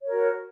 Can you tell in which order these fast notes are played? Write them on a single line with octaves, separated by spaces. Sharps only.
C#5 A#4 F#4